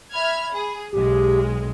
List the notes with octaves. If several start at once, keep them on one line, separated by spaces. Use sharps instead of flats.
E5 B5 F6 G#6
G#4
B1 G#3 G4